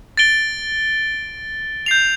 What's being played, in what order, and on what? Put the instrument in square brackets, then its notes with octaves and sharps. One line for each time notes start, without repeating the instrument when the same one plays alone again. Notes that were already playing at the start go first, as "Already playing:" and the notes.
[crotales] A6 D7 G7
G6 C7 F7